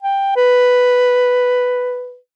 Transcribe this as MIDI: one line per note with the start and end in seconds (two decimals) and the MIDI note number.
0.03 0.32 79
0.36 2.17 71